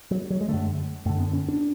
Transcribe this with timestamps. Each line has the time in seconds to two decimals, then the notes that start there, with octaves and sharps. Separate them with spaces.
0.11 F#3
0.30 F#3
0.41 G#3
0.48 F#2 D3 A3
1.06 F#2 A3
1.09 D3
1.20 B3
1.33 C#4
1.48 D4